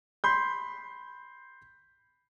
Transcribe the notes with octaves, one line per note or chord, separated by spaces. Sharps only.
B5 C6 G6